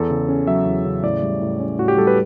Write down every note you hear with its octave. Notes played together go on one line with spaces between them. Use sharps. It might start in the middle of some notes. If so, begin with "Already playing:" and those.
Already playing: E2 A4
C#3
C#4
F#3 E5
E2
C#3
A2 D5
G3
A2
C#4
A2 F#4
G4
G3 A4
B4